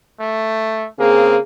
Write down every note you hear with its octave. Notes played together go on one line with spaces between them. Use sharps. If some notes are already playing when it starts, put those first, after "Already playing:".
A3
C#3 A#3 C4 G#4